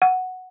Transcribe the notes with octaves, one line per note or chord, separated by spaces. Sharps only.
F#5